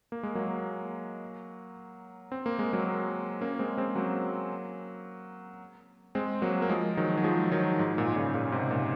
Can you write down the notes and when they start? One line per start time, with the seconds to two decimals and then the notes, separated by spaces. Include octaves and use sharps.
0.12 A#3
0.23 G#3
0.35 F#3 A#3
2.32 C4
2.46 A#3
2.59 G#3
2.73 F#3 A#3
3.41 A#3 C#4
3.59 G#3 C4
3.77 G#3 C4
3.95 F#3 A#3
6.15 G#3 C4
6.42 F#3 A#3
6.62 A#3
6.69 F3 G#3
6.97 D#3 F#3
7.17 F#3
7.24 F3 G#3
7.52 D#3 F#3
7.79 G#2
7.98 A#2
8.16 A#2 C#3
8.34 A#2 C#3
8.52 G#2 C3
8.71 A#2